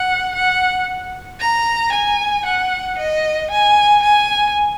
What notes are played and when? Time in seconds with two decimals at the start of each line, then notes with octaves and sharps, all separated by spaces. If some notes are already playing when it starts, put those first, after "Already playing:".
Already playing: F#5
0.36 F#5
1.41 A#5
1.93 G#5
2.46 F#5
2.98 D#5
3.50 G#5
4.03 G#5